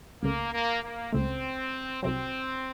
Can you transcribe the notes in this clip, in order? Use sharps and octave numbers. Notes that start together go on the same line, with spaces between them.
C#2 C#3 A3 A#3
A#3
A#3
C#2 C#3 A3 C4
C2 C3 F#3 C4